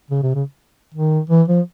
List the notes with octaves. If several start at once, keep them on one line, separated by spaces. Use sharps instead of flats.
C#3
C3
C#3
D#3
E3
F3